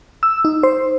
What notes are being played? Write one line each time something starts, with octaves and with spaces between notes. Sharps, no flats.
E6
D#4
C5